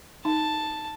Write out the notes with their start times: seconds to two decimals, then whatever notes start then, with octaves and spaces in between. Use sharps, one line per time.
0.25 D#4 A5